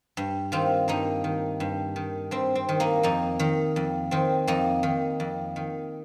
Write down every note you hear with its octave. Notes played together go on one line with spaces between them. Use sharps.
G2
D#3 C4 F4
G2 A#3 D#4
D#3
G2
D#3
G2 C4
C4
D#3
A#3 D#4
F2 A#3 D#4
D#3
F2
D#3 C4
F2 A#3 D#4
D#3
F2
D#3